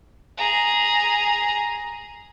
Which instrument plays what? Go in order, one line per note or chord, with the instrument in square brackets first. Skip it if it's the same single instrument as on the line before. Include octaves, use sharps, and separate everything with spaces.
[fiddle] G#4 A#5